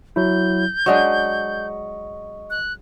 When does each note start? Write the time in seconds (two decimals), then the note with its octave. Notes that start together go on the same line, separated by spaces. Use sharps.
0.16 F#3 E4 G6
0.86 F#3 G#3 D4 D#5 C#6
2.50 F#6